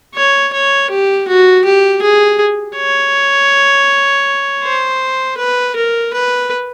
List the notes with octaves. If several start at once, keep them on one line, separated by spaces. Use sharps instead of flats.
C#5
C#5
G4
F#4
G4
G#4
C#5
C5
B4
A#4
B4